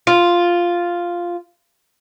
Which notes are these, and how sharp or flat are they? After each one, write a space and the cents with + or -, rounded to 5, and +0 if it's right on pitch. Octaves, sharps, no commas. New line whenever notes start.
F4 +0